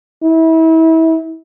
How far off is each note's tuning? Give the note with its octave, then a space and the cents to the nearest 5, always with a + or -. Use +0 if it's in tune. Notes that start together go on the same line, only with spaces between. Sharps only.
E4 -30